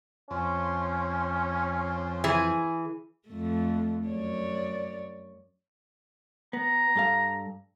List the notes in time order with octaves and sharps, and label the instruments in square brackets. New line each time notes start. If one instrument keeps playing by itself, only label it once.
[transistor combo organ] F2 C4 [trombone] C#4
[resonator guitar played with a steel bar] E3 G#4
[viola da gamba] F2 A3
F#2 C#5 D5
[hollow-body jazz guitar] B3 [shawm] A#5
[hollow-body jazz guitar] G2 A4 F5